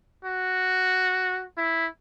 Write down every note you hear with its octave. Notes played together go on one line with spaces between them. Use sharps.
F#4
E4